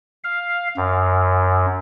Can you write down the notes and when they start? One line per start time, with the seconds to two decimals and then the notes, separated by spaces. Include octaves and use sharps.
0.24 F5
0.77 F#2